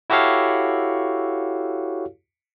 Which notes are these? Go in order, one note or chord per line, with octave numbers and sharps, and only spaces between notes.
E4 F#4 G4 A4 C#5 F5